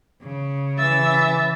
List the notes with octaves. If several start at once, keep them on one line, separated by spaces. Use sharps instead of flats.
C#3
E3 E5 A6